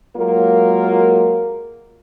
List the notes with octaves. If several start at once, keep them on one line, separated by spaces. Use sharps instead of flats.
F#3 G#3 A#3 F4 A#4